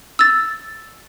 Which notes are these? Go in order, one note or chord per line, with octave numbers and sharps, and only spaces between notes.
E6 A6